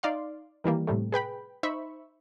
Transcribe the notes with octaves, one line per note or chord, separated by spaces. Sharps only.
D#4 D5 F5 C6
D#3 E3 G3 A#3
A2 C3 G3 A3
G#4 B4 G5 B5
D#4 C5 E5 B5 C#6